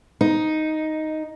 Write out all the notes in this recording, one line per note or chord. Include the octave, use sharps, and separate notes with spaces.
D#4